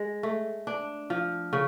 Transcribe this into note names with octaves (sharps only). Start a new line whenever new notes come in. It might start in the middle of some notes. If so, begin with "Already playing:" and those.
Already playing: G#3
A3
D4
F3
C#3